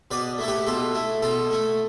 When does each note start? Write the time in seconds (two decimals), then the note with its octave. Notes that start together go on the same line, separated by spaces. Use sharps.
0.11 B2 B4 D5
0.38 A3 E4 A4
0.48 G4 B4
0.67 B2 F4 A4
0.95 A3 E4
1.22 B2 F4 A4
1.51 A3 E4